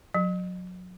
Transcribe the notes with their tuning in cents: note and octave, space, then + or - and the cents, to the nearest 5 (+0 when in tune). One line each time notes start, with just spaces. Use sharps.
F#3 -25